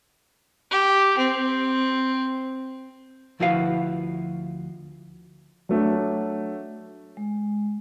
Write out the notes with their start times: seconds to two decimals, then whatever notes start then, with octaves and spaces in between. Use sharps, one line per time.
0.71 G4
1.18 C4
3.40 D2 F3 E4 F#4 B4 F5
5.69 F#3 A3 D4
7.17 G#3